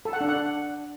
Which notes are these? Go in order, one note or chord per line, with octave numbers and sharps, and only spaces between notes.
A4
F#5
D4
F#5